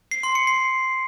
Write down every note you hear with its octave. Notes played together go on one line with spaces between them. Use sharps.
C7
C6
C#7
C7